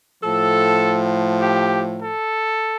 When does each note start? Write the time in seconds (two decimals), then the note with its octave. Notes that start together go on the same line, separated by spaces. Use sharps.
0.23 A2 F3 A4
1.41 G4
2.01 A4